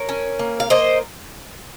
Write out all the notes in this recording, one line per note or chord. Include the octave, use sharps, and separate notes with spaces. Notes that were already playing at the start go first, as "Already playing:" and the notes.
Already playing: A#4 C#5
C#4
A#3
F5
A#3 C5 D#5